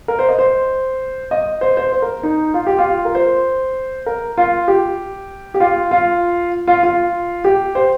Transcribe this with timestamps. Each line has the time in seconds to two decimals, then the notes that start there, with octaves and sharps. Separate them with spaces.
0.08 A#4
0.19 C5
0.29 D#5
0.39 C5
1.31 D#5
1.61 C5
1.77 C5
1.92 C5
2.02 A#4
2.23 D#4
2.54 F4
2.67 G4
2.79 F4
3.05 A#4
3.15 C5
4.06 A#4
4.38 F4
4.68 G4
5.54 G4
5.60 F4
5.91 F4
6.68 F4
6.83 F4
7.44 G4
7.75 C5